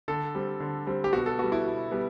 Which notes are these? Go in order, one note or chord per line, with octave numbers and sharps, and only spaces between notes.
D3 A4
G3 C4
D3
G3 C4
G4
B2 F#4
A4
G3 B3 F#4
E4
B2
G3 B3